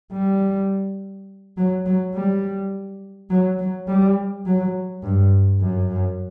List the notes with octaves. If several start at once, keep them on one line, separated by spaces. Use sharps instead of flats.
G3
F#3
F#3
G3
F#3
F#3
G3
F#3
G2
F#2